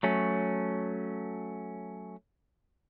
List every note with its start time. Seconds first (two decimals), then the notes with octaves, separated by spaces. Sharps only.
0.03 F#3 A3 C#4